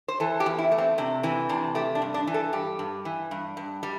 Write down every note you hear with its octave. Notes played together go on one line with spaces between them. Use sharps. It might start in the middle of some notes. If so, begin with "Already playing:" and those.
C5
E3 A4
G4
E2
E4
A3
C4
C3 D4
E3 C4
C3 D4
A3 G4
D4
G2
D4
E3
A4
G2 G4
G2
E3
G2
G2
G3